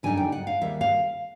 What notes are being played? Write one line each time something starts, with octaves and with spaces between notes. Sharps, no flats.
F#2 D3 G3 A#3 D#4 G#5
G5
F#5
F5
D#2 D#3 G3 E5
F5